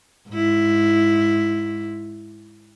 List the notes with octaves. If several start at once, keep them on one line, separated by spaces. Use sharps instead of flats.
G#2 E4